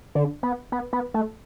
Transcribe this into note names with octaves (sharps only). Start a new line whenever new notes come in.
D3
B3
B3
B3
A3